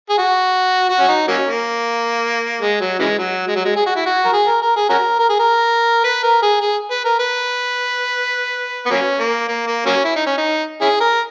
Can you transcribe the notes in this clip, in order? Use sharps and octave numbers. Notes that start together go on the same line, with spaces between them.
G#4
F#4
F#4
C#4
D#4
F#3 A#3 C#4
A#3
G#3
F#3
C#3 E3 G#3
F#3
G#3
F#3
G#3
G#4
F#4
E4
F#4
A#4
G#4
A#4
A#4
G#4
C#4 F#4 A#4
A#4
G#4
A#4
B4
A#4
G#4
G#4
B4
A#4
B4
B3
F#3 A#3 C#4
A#3
A#3
A#3
F#3 A#3 C#4
E4
D#4
C#4
D#4
C#4 E4 G#4
A#4